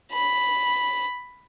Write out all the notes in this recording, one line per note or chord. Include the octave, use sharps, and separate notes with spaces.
B5